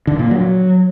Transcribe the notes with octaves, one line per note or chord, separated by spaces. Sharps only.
D3
A#2
F#3